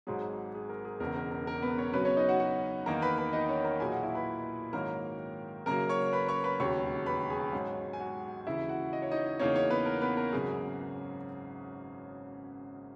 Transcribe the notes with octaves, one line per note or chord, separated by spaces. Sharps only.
G#1 G#2 F#3 G#4
G#4
A#4
G#4
E1 E2 C#3 A#4
A#4
A#4
A#4
B3 B4
C#4 C#5
F#2 C#3 F#3 B3 C#4 B4
C#4 C#5
D#4 D#5
F#4 F#5
F#4 F#5
E2 D#3 A#3 D#4 A#4 A#5
B4 B5
B4 B5
D#4 D#5
C#4 C#5
A#4 A#5
B1 A#2 F#3 A#3 G#4 G#5
F#4 F#5
E4 E5
B4 B5
G#2 D#3 F#3 A#3 C#4 A#4 A#5
F#2 C#3 F#3 A#3 A#4 A#5
C#5 C#6
B4 B5
C#5 C#6
B4 B5
E1 D#2 C#3 F#3 C#5 C#6
B4 B5
G#4 G#5
G#2 F#3 C#4
G#5
F#4 F#5
D#2 C#3 E3 E4 E5
F#4 F#5
D#5
C#5
D#4 D#5
E2 C#3 E3 A#3 C#4 D#4 C#5
C#4 C#5
B3 B4
A#4
B3 B4
A#4
G#1 F#2 C#3 G#4